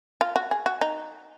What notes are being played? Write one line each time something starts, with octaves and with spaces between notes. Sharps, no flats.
F4
F#4
G#4
F#4
D#4